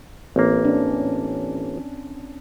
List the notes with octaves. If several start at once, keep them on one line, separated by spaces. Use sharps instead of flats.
A1 A#3 C4
C#4 D4